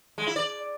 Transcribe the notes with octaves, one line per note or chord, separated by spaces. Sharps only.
G#3
E4
D5